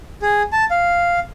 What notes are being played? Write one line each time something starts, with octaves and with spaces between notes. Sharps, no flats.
G#4
A5
F5